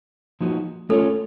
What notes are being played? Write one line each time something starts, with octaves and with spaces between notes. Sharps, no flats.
F3 A#3 D#4 F#4
A3 C#4 F4 A4 A#4 C#5